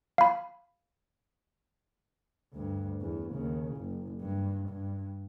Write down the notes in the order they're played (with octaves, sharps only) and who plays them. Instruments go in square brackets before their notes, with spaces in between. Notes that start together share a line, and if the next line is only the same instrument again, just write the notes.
[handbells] F5 B5
[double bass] D2 G2
E2
D#2 C#3
F#1
G2
G2